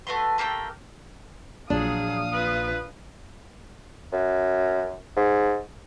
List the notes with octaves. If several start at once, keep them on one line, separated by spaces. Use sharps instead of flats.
A3 F#4 B4 C6
A3 A#3 G4 G5
A#1 F#3 D4 G#4 F5 D#6
F4 B4
F#2
G#2